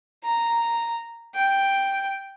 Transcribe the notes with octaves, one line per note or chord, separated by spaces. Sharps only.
A#5
G5